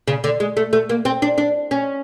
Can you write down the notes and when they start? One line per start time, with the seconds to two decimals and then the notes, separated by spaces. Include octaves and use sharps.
0.07 C#3
0.24 D3
0.40 G#3
0.57 A3
0.73 A3
0.89 A#3
1.05 C4
1.22 D4
1.38 D4
1.71 C#4